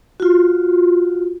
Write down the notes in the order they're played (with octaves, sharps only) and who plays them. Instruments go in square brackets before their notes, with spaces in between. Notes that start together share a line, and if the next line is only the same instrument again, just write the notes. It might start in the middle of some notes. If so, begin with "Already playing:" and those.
[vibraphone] F4 F#4